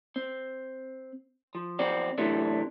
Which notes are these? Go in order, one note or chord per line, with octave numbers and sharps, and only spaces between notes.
C4
F3
B1 F2 C4 F#4 D5
C3 E3 F#3 A3 D4